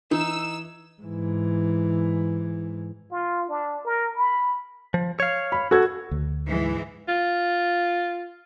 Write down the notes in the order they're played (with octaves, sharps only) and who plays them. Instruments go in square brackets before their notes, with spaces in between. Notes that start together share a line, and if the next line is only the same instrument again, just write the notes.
[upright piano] E3 [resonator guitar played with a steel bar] D#4 [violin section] E6
[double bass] G#2 E3
[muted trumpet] F4
D4
A#4
B5
[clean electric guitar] F3
C#5 F5
[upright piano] B5
F#4 A4 G#6
[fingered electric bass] D2
[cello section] G#2 E3 G#3
[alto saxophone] F4